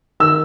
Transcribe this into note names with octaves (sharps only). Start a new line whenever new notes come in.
D#3 E6